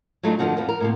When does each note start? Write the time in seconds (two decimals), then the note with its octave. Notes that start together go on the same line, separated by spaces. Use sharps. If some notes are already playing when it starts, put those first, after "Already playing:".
0.23 F#3 G#3 A3 D4 D#4 F4
0.39 G2 B2 D3 D#3 F3 F#4
0.57 F2 E3 F3 B3
0.69 A#4
0.80 A2 C3 A#3